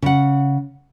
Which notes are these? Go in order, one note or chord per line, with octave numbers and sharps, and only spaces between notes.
C#3 F#5